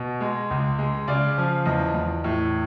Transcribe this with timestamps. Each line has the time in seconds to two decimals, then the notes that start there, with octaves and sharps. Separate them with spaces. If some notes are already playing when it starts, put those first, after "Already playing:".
Already playing: B2
0.20 G#3
0.50 C#2
0.78 G#3
1.08 C#3 D5
1.37 F3
1.65 E2 D#5
1.94 E2
2.24 A2